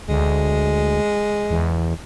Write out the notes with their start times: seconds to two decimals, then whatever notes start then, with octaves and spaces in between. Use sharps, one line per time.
0.09 D2 G#3
1.50 E2